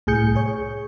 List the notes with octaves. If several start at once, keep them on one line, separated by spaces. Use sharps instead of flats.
C2 A2 G#4 G6 C#7
G#4 C#5